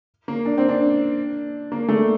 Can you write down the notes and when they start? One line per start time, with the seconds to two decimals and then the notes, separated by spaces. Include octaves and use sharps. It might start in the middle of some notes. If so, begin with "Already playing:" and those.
0.28 A#3
0.45 D4
0.58 C4
0.69 D4
1.72 A#3
1.88 A3